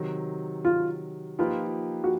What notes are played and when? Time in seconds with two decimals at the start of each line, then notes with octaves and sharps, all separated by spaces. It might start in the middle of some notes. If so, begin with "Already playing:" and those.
Already playing: C3 D#3 F#3
0.65 F4
1.39 F3 A#3 D#4 F4 G4 B4
2.04 F#4